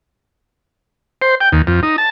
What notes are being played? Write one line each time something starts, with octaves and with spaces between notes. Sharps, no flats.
C5
G5
D#2
F2
D#4
A5